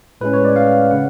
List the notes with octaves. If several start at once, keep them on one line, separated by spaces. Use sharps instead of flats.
A2 G#3 C#4 B4
C#5
D5
F5
C#3 F#5